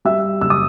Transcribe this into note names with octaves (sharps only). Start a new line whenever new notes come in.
G3 E5 E6
F#1 E6
D#6